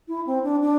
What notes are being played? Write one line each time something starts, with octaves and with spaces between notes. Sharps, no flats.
E4
C4
D4
D4